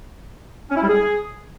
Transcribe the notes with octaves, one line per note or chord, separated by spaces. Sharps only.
C#4
E4
G3
G#4